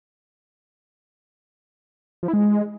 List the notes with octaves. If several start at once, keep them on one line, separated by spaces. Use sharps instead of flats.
F3
E4
G#3